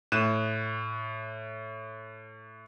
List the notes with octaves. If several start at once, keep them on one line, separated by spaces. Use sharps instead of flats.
A2 F#6 D#7 E7